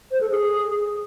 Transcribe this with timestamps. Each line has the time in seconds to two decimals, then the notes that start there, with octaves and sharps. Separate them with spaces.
0.11 C5
0.21 A4
0.30 G#4